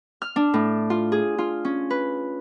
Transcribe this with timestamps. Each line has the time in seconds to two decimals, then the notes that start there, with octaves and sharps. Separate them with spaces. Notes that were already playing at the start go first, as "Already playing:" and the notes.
0.22 F6
0.36 D4
0.54 A2
0.90 F4
1.12 G#4
1.38 F4
1.65 C#4
1.90 B4